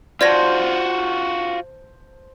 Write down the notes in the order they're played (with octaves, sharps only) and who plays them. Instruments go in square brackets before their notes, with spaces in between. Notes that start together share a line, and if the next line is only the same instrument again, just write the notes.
[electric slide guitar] F4 F#4 [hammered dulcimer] C5 A5 [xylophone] D5 G#6 A#6